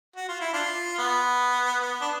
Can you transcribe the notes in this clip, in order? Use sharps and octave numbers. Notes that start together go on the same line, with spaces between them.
F#4
F4
E4
D4 F4
B3
B3
D4